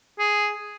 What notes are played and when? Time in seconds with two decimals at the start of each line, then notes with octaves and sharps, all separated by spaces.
0.19 G#4